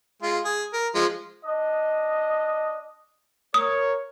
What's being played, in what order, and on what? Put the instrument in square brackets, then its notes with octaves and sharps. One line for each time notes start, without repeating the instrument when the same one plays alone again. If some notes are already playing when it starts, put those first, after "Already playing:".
[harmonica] G#3 F4
G#4
A#4
F3 G#3
[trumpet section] D4 D#5
[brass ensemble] A#4 C#5 [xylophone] D#6